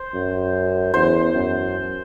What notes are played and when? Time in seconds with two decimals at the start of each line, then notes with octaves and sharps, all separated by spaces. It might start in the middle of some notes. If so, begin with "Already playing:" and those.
Already playing: C5
0.14 F#2
0.94 E2 C5
1.34 F#2